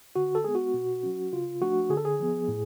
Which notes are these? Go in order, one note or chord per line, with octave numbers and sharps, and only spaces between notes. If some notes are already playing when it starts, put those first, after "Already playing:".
D3 F#4
A4
G#3 B3 G#4
F#4
B2
F#3 C#4
C#3 F4
F3 A3 D4 F#4
D3 G#4
A4
G#4
F3 B3
A2